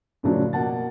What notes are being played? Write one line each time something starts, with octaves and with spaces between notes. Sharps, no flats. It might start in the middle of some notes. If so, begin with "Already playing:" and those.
F#2 A2 C#3 F3 F#3 D4
B2 A#3 F#5 A5 A6